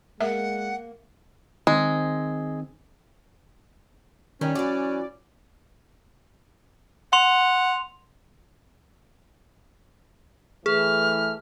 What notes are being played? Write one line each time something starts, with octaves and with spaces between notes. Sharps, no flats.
G#3 A#3 E5 F#5
D#3 G#3 C4
D#3 G3 C#4
E3 F#3 D5
F#5 C6 F7
E3 A3 G#4 F6